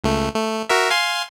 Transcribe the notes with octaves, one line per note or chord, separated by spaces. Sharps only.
C#2 A3
A3
F#4 A#4 E5
F5 G#5 C6